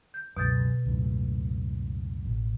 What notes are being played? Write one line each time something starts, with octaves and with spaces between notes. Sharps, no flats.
G6
C#2 F#2 B2 G6 A6
C#2 F#2 A2
A1